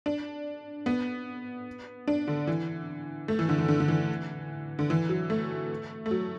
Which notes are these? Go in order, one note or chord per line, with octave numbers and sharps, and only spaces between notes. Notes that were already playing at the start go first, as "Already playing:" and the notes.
D4
B3
D4
D3
E3
A3
E3
D3
E3
D3
D3
E3
D3
E3
F#3
A3
A3
F#3